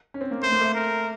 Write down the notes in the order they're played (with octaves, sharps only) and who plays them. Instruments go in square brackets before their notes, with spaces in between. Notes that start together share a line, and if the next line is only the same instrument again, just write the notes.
[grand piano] C#4
C4
A#3
[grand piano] A3 [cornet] C5
[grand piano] A#3
A3
[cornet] A#4